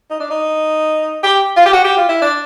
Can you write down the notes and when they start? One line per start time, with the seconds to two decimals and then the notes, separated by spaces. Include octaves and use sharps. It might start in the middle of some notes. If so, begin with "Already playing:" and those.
0.11 D#4
0.20 D4
0.30 D#4
1.24 G4
1.57 F4
1.66 G4
1.73 F#4
1.85 G4
1.97 F4
2.09 E4
2.22 D4